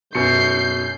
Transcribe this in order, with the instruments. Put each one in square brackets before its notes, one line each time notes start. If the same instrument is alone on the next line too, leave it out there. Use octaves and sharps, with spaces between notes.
[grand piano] F#2 B2 C#7 [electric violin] G6 C7